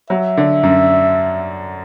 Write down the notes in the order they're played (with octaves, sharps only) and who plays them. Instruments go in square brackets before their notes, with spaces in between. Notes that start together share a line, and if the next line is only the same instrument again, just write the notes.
[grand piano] F#3 [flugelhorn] E5
[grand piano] D3
F#2